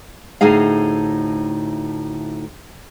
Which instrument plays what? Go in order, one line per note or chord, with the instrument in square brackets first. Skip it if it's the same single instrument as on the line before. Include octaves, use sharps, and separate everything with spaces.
[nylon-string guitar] D2 A2 D#4 G#4 F5